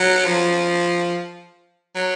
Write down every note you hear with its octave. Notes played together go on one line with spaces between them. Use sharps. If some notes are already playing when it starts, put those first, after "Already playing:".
Already playing: F#3
F3
F#3